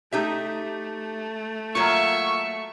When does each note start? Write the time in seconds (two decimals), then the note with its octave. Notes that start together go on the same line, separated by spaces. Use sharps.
0.13 A3 D#4 G4 E5
1.75 F#3 A#3 F4 E5 C#6